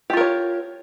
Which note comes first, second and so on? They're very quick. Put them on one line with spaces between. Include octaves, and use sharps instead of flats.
G4 F4 A#4 C#5